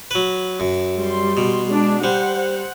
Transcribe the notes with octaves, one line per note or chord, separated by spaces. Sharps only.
F#3 B4
F#2
G3 C6
B2
G#3 D4
G3 C5 F#5